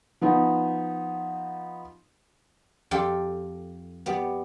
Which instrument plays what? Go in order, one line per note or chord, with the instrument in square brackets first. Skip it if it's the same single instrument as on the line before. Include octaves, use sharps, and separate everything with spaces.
[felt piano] F3 B3 D#4
[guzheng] F2 G4 A4 G5 C6
B3 G4 D5